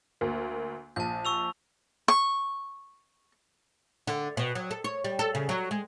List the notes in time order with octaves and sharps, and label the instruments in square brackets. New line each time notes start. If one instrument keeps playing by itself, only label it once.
[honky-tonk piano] D2 A#3
[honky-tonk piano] A#1 [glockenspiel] A5 G6
[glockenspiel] C#6 E6 F7
[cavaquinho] C#6
[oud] D3
B2
F#3
A4
C#5
G3
A4
C#3
F#3
G#3